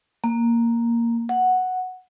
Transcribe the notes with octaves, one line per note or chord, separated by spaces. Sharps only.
A#3
F#5